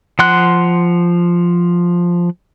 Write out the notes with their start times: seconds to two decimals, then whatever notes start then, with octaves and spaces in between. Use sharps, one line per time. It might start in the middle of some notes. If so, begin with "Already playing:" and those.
0.19 F3 F#5 C6 F#6